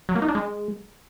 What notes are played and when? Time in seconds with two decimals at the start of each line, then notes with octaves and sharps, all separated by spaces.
0.09 F#3
0.15 A#3
0.22 D#4
0.28 D4
0.35 G#3